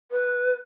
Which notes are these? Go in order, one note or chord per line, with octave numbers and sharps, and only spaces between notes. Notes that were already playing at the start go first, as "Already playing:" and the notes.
B4